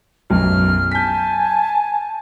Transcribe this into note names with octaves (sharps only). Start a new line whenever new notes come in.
B1 F#2 F6
G#5 A5 G6 B6